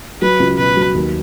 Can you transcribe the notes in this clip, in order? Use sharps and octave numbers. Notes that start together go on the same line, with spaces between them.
F#3 B4
C#2
B2 B4
F#3
D#2